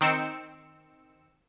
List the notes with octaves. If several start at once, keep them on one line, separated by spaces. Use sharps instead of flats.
D#3 C4 E6 C#7